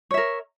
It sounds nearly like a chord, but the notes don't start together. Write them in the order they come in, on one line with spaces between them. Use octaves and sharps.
C#5 E5 A#4